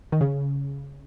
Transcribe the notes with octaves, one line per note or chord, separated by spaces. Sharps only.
D#3
C#3